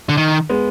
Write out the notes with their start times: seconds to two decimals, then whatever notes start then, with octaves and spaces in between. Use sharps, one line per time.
0.09 D3
0.17 D#3
0.49 G#3 B3